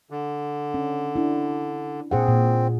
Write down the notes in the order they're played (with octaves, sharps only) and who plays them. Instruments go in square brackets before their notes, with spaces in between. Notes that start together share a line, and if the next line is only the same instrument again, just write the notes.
[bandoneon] D3
[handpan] C#4
D4 E4
[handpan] A#2 G#4 F#5 [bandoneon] C4
[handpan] A#2